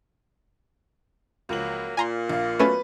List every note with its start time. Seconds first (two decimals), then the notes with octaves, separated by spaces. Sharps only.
1.49 C#2 F3 F#3 A#3 F#7
1.97 A#2 F5 G#5 A#5 C6
2.29 A#1 F5
2.59 F#3 A3 B3 C#4 B4